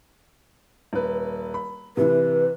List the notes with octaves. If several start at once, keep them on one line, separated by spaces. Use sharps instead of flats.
D#1 B4
B5
C3 E3 B4